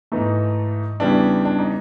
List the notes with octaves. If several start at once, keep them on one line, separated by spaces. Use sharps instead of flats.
G#2 E3 A3 D#4
E2 C#3 E3 G3 D4
D4
D#4